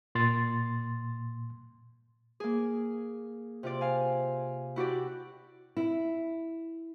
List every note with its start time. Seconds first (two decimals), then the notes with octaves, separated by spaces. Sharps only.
0.15 A#2 C6 A6
2.40 A#3 G#4
3.63 C3 F4 D5
3.81 F5 G#5
4.76 E4 F#4 G4 D5
5.77 E4